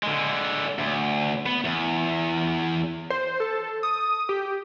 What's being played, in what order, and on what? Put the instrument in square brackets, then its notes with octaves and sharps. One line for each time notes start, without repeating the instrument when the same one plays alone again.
[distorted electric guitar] D3 G#3
D2
B3
E2
[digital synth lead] C5
A4
D#6
G4